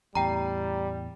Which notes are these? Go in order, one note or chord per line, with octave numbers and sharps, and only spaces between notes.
E2 A2 G3 G5 A#5